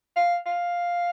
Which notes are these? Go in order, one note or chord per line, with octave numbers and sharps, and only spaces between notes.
F5
F5